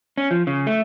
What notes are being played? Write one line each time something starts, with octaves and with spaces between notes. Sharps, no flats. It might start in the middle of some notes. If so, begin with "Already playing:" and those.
C#4
F3
C#3
A3